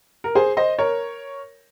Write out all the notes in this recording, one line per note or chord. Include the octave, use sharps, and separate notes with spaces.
A#4
G#4 C5
C5 D#5
A#4 C#5